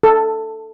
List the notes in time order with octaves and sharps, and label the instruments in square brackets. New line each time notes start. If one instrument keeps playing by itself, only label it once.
[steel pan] A4